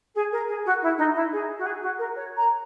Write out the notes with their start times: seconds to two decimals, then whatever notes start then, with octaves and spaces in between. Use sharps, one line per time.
0.15 G#4
0.32 A#4
0.47 G#4
0.65 F#4
0.82 E4
0.97 D#4
1.14 E4
1.32 G#4
1.58 F#4
1.65 G#4
1.82 F#4
1.98 A#4
2.15 C#5
2.36 A#5